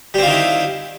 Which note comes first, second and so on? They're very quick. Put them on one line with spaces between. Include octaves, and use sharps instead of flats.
G3 C4 F4 D#3 E4